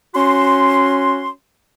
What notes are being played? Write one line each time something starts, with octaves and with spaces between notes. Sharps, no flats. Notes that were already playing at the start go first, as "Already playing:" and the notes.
C#4 F#4 C6